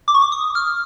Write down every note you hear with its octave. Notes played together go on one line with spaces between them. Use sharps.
D6
C#6
D6
D#6
F6